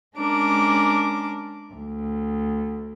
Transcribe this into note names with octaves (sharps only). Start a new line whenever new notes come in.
G#3 C#4 D4 A#4 D6
D2